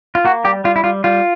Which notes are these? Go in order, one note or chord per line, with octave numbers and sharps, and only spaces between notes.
F4
A#3 F#4
G3 G4
G3 F4
E4
G3 F4
G3 F4